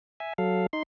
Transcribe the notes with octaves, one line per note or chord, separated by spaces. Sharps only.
E5 G#5
F#3 A4 F5
D#4 C6